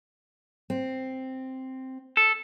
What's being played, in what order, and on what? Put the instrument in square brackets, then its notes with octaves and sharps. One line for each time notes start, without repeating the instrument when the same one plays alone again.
[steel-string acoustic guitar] C4
[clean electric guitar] A4